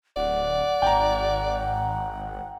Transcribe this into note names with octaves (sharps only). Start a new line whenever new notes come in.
D1 D5 F#5
G#1 G5 A#5